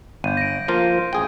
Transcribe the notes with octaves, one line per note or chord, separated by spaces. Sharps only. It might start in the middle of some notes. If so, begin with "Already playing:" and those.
G1 G6 D#7
A#6 D7
F3 A#3 F4
A1 G#4 G5